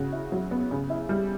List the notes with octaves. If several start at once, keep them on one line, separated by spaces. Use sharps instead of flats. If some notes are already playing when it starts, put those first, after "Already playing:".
Already playing: C#3 F#4
E4
F#3
B3
C#3
E4
G3